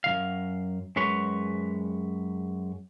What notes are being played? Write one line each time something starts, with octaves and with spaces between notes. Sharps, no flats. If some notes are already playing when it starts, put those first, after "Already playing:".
F#2 D#3 F5
F#2 G#3 B4 C#5